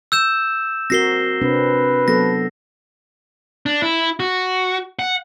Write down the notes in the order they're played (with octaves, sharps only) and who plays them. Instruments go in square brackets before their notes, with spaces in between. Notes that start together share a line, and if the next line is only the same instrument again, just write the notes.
[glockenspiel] E6 G6 E7
[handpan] C4 F#4 A#4 [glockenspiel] A#6 C7 G7
[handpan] C3 C4 D4 [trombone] B4
[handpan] F#3 B3 A4 [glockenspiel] A#6
[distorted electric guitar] D4
E4
F#4
F#5